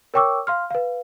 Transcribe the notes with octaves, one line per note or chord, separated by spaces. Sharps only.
A#4 C#5 G5 C#6 D6 E6
F5 C6 F6
B4 F5